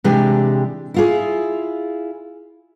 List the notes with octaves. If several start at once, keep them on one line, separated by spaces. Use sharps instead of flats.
C3 E3 G#3 D4 G4
E4 F4 G#4